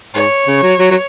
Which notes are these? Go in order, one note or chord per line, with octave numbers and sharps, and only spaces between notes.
G#2 C#5
C#3
F#3
F#3
F#3